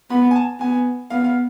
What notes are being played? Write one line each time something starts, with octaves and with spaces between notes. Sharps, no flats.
B3 B5
G#5
A5
B3 G#5
B3 F5
F5